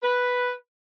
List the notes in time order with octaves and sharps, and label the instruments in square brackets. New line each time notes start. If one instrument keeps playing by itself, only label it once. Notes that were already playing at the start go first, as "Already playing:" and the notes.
[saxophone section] B4